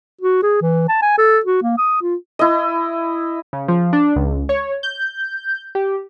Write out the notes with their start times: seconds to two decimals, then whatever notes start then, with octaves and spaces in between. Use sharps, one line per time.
0.21 F#4
0.43 G#4
0.62 E3
0.89 A5
1.02 G#5
1.18 A4
1.45 F#4
1.62 A#3
1.78 D#6
2.02 F4
2.39 E4 D#5
3.53 C#3
3.68 F3
3.93 D4
4.16 C#2
4.49 C#5
4.83 G6
5.75 G4